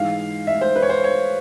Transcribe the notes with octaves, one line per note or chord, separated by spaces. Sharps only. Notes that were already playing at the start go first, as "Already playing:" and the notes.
Already playing: G#2 E3 F5
E5
C5
B4
C#5
C5
C#5